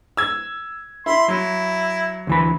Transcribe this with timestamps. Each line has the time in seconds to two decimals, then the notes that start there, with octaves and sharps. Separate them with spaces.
0.17 E6 G#6
1.06 E4 B5 C6
1.28 F#3 E4
2.27 D2 E3 B5